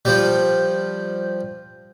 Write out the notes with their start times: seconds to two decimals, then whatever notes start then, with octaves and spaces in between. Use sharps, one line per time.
0.05 F3 G3